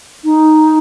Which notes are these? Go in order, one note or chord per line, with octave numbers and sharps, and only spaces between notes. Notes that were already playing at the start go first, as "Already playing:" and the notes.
D#4